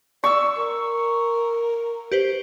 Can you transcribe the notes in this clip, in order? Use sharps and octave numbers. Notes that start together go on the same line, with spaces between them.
D5 C#6 E6
A#4
G4 B4 C5